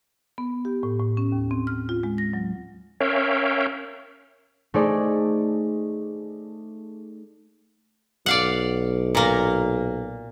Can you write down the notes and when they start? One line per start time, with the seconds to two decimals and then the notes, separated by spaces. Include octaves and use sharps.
0.38 B3
0.65 G4
0.83 A2
1.00 A2
1.17 C#4
1.32 D#2
1.51 C4
1.67 F6
1.89 F4
2.03 G#3
2.18 A#6
2.33 F#3
3.00 C#4 A#4 C#5 E5 F5 G5
4.74 A3 D#4 G#4 C5 D5
8.26 B1 D5 F5 F#5
9.15 A#2 A#3